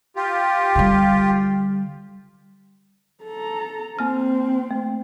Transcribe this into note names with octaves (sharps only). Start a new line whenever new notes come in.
F4 G4
D3 G3
A4 A#5
A#3 C4 F6
A3